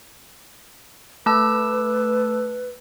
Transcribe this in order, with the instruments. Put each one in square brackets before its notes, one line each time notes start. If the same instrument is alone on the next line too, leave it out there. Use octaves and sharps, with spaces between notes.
[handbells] A3 A5 E6 [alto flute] B4